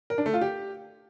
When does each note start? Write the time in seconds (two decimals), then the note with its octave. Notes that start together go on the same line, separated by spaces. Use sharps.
0.10 A#4
0.18 D4
0.26 A3
0.34 F4
0.41 G4